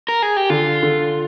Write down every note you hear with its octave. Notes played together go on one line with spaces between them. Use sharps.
A#4
G#4
G4
D3 F4
D3